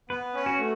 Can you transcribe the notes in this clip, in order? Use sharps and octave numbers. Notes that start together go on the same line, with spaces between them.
B3 B4
C#4
F#4
A3